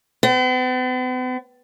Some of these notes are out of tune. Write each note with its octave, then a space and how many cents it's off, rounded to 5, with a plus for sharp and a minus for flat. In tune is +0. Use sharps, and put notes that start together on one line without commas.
B3 +45